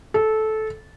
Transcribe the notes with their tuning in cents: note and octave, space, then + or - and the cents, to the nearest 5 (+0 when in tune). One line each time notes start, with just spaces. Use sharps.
A4 -15